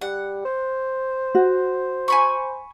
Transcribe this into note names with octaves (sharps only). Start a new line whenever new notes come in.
G3 F#5
C5
F#4
G#5 B5 C#6